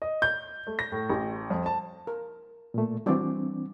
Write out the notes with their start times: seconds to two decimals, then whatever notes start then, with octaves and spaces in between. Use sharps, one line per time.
0.02 D#5
0.22 G6
0.67 A3
0.79 A#6
0.92 A2
1.09 A1
1.50 F2
1.66 A5
2.07 A#4
2.74 A#2 A3
3.06 E3 G3 C4 D4 F#4 D5